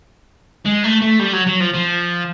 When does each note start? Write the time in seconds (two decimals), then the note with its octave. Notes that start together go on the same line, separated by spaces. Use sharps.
0.66 G#3
0.84 A3
1.02 A3
1.19 G3
1.33 F#3
1.47 F#3
1.60 F3
1.74 F3